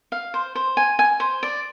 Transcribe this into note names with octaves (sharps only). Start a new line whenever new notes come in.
F5
C5
C5
G#5
G#5
C5
D5